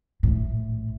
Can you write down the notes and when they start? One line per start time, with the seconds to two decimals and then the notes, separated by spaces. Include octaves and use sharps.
0.23 A#1 A2